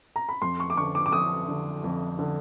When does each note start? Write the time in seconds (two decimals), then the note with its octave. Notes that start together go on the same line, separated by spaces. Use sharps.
0.16 A#5
0.29 B5
0.42 F2 C6
0.60 C#6
0.70 D6
0.77 D3 C#6
0.95 D6
1.06 D6
1.12 F2 D#6
1.48 D3
1.84 F2
2.19 D3